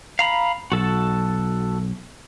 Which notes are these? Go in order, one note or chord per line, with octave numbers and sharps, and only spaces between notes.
F5 A#5 B5
B1 F#4 A4 A5